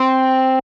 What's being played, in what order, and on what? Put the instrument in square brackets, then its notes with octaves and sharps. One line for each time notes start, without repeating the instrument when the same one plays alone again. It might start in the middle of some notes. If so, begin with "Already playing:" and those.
Already playing: [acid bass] C4